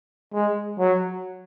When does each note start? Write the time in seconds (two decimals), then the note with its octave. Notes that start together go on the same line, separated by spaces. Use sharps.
0.34 G#3
0.79 F#3